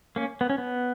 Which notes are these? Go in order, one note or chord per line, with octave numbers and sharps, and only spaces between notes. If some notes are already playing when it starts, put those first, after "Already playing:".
A#3 C#4
B3
C#4
B3